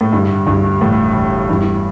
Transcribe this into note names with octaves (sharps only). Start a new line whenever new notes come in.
A2
G2 D3
D2 G2
E1 A2
E1
E2 G2